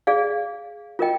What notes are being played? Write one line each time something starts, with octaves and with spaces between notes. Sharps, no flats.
G#4 D5 F5
F4 A#4 D#5 G5